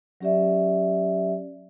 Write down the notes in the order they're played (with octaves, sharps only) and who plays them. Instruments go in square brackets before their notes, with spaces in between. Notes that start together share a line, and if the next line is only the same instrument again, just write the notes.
[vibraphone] F#3 C#4 G4 D5 E5